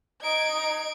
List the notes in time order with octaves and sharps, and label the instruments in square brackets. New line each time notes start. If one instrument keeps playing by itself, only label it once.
[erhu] D#4 [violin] G#6 D7